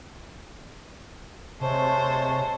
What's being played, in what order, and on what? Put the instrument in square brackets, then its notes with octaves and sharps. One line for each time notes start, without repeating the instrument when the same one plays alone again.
[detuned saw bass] C3 [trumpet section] G#3 A3 [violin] C5 C#5 [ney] A5